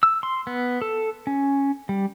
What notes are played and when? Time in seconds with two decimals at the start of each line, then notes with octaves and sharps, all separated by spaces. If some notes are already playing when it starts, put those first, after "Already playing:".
0.03 E6
0.23 C6
0.47 B3
0.82 A4
1.27 C#4
1.89 G3